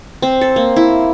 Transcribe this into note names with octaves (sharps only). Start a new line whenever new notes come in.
C4
A4
A#3
E4